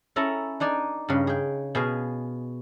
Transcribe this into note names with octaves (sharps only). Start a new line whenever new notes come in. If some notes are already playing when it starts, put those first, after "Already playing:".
C#4 E4 A4 A#5
D4 D#4 D5 G#5
G2 C#3
G#4 G5
B2 G#4 F5 G#5